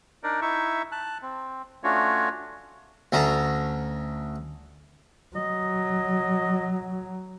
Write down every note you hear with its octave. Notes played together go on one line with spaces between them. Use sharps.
D4 D#4 A#4 D5
D#4 E4 E5 C#6
A5 F#6
C4
A3 C#4 D4 F4 F#4 C#5
D2 C#4 A5 A#5
F#3 D#5